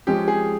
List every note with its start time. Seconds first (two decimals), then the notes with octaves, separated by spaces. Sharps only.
0.07 F3 G#3 C#4 G4
0.28 G#4